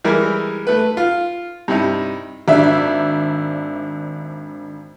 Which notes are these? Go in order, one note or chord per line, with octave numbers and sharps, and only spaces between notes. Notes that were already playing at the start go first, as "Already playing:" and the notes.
E3 G3 G#3 A#4 E5
A3 B4
F4
G2 C3 D#4 E4
G#1 D4 E5